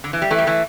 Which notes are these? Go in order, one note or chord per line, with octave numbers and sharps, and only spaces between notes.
D3
E3
G3
E3 A3
G3
E3 A3